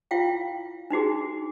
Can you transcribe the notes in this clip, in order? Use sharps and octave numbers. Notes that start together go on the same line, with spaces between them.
E4 F4 F5 G5
D4 D#4 F#4 G#4